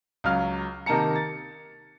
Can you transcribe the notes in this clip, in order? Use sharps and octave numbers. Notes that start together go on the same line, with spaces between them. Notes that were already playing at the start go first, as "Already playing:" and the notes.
C#2 F#3 F5 F6
C3 D#3 A#3 A5 A#5 C#7
A6